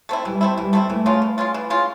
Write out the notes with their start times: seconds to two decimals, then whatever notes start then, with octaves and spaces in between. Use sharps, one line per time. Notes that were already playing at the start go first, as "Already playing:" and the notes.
0.09 A3 C4 E4
0.25 E3 G3
0.41 A3 C4 E4
0.58 E3 G3
0.73 A3 C4 E4
0.90 E3 A3
1.06 G#3 C#4 F4
1.22 E3
1.38 G#3 C#4 F4
1.54 E3
1.70 G#3 C#4 F4